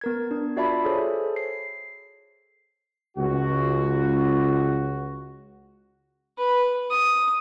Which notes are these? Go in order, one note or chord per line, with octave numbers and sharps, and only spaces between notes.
B3 A#4 G#6
D4
F4 F#4 D5 E5 A5 B5
G#4 A4 C5 C#5
C7
C#2 F#4
B4
D#6